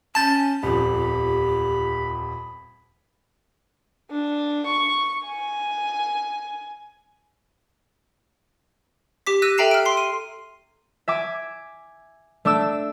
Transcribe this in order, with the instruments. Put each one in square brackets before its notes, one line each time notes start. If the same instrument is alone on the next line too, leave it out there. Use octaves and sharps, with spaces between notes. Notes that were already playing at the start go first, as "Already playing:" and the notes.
[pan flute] C#4 [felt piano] G#5 G6 [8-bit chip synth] A5 A6
[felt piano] D#1 F2 [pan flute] G4 [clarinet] B5
[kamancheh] D4
C#6
G#5
[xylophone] G4 D6 B6
E6 F#6 A#6 D#7
A4 E5 G5 A#5 C7 E7
F6 D7
C6 C7
D#7
[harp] E5 G#5 D6
A3 D4 D6 E6